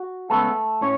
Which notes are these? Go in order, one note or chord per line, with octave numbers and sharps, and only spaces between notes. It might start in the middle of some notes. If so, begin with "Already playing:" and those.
Already playing: F#4
C#3 G#3 A3 B3 A4
A2 C#4 C#5